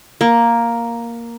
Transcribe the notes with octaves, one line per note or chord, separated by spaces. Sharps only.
A#3